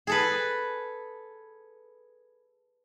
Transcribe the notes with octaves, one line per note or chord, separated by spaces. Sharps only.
G#4 A4 B4